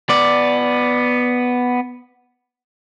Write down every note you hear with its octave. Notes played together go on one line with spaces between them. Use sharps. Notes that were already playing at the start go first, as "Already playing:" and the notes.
B3 D5